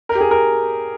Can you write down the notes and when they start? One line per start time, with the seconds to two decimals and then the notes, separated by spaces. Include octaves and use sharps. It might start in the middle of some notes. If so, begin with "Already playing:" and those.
0.09 A#4
0.15 G4
0.20 G#4
0.31 A#4